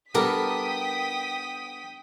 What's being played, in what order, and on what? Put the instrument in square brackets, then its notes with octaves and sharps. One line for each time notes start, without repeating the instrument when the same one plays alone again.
[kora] G3 D4 [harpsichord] B3 A4 [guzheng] A#4 [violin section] G5 D#6 B6